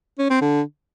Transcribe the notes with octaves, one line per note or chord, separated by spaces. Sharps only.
C#4
C4
D3